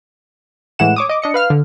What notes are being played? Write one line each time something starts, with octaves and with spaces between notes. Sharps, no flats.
A2 E3 G#3 F#5 E7
C#5 D6 D#6
D#5 D6
D4 D#5 C#7
B4 F5 F6
D3